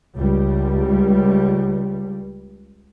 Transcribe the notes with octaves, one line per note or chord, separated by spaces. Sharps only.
C#2 G3